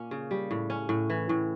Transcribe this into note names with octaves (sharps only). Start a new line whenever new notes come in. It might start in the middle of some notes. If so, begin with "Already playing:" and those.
Already playing: A#2 A#3 C#4
C#3
G3
A2
C#4
A2
E3
A2